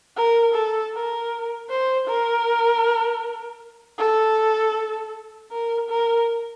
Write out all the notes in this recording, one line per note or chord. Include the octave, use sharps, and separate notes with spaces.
A#4
A4
A#4
C5
A#4
A4
A#4
A#4